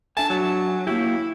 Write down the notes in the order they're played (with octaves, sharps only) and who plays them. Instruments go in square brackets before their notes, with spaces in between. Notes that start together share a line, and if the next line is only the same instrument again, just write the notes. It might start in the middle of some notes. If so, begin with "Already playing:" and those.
[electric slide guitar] D4 E5 G#5 [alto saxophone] A5
[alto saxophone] F#3
[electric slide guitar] A#3 F#4 G4 [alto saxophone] E4